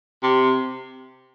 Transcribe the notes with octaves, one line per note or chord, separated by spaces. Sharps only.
C3